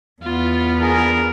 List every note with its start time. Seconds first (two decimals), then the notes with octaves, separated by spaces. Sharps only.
0.23 E2 B3 F4
0.81 D4 G#4 A#4